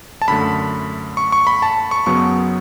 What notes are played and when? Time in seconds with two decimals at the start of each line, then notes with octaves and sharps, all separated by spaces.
0.22 A5
0.28 F#2 D3 A3 B5
1.17 C#6
1.32 C#6
1.47 B5
1.62 A5
1.91 C#6
2.06 F#2 C#3 F#3 B3 C#6